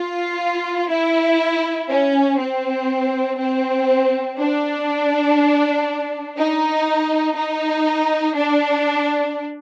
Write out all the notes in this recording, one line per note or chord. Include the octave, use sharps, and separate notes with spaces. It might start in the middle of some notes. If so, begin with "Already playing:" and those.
Already playing: F4
E4
C#4
C4
C4
D4
D#4
D#4
D4